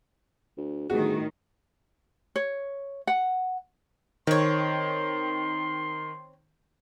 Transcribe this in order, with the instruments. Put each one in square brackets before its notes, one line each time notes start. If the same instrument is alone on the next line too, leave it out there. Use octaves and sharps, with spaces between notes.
[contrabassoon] D2
[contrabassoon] G1 [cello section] A2 D#3 [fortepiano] F#4 [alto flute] G#4
[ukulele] C#5
F#5
[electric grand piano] D#3 [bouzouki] C4 C#5 [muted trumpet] C6